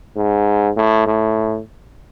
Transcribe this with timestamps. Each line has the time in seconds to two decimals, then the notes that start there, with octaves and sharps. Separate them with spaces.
0.17 G#2
0.77 A2
1.07 A2